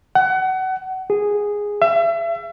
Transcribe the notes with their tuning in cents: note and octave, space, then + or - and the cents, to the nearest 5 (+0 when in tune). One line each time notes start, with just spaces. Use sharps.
F#5 +25
G#4 -5
E5 +35